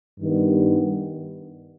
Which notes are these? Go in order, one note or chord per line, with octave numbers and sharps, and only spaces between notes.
G2 D#3 G3 B3